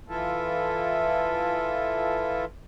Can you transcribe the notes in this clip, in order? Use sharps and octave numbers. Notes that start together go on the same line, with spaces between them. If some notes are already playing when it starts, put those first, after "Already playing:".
E3 E4 F4 A4